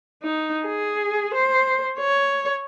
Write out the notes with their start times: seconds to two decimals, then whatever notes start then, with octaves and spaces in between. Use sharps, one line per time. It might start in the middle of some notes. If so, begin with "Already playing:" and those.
0.23 D#4
0.66 G#4
1.35 C5
1.99 C#5